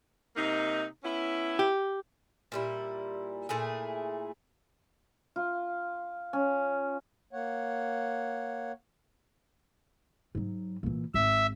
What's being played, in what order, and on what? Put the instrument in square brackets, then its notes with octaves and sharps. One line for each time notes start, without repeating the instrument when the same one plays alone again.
[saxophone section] C3 A#3 D#4
B3 C#4 E4
[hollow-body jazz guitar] G4
[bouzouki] A#2 G3 E4
A#2 A3 E4 G#4
[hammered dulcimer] F4
C#4
[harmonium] A#3 C#5 F#5
[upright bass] G#2 F#3
A#2 E3
[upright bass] G#1 [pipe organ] E5